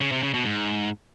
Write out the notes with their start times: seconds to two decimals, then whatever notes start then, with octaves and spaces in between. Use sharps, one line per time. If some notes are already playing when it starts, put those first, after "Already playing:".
0.01 C#3
0.12 C3
0.23 C#3
0.34 B2
0.45 G#2